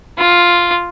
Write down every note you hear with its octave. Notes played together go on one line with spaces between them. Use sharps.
F4